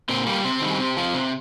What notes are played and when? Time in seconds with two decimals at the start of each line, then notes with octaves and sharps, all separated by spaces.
0.09 A#2 C4
0.27 G3 A#3
0.44 C3 C4
0.62 D#3 G3
0.79 C3
0.97 F3
1.14 C3